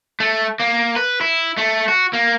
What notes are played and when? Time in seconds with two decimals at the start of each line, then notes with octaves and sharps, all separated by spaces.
0.20 A3
0.60 A#3
0.96 B4
1.21 E4
1.57 A3
1.88 F#4
2.13 A#3